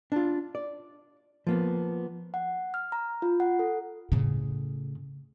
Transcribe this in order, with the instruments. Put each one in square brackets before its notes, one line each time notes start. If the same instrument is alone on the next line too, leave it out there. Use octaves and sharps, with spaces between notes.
[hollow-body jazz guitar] D4 F4
D5
F3 A#3 B3
[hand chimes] F#5
F6
A#5
F4
F#5
A4
[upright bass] A2 C#3